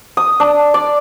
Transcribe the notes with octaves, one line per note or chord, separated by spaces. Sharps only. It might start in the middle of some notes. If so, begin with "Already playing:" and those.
D#6
D4
D5